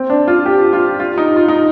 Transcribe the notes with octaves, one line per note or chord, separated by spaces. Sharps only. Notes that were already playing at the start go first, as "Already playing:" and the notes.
Already playing: C4
D4
F4
G4
F4
F4
D#4
F4
D#4